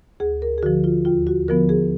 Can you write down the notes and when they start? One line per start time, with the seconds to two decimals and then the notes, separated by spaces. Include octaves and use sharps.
0.20 D2 G#4
0.42 A#4
0.58 G#4
0.63 D3 F3 F#4
0.84 F4
1.05 D#2 F4
1.27 F#4
1.48 D3 F3 B3 A#4
1.69 G#4